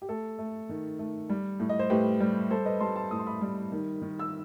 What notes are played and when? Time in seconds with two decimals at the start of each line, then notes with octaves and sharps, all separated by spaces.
0.02 G4
0.09 A3 A4
0.39 A3
0.69 D#3
0.99 A3
1.29 G3
1.60 A2
1.69 D#5
1.79 C5
1.90 A2 G4 B4
2.20 G3
2.50 G3 A4 C5
2.66 B4 D#5
2.80 G3 A5 C6
2.96 A5 C6
3.11 A2 D#6
3.19 C6
3.27 B5 D#6
3.41 G3
3.72 D#3
4.02 D#3
4.19 E6